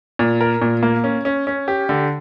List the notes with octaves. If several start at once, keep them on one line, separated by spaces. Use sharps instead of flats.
A#2
A#4
A#2
A#3
C#4
C#4
C#4
G4
D3